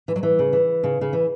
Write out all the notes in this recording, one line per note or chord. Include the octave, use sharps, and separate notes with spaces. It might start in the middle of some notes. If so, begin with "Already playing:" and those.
E3
F#3
E3
C#3
E3
C#3
C#3
E3